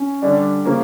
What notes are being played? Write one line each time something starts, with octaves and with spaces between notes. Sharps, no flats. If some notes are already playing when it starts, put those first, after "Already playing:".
Already playing: C#4
D3 G3 D4
C#3 F3 A#3 C#4